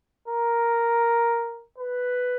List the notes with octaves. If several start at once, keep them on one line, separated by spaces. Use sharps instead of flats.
A#4
B4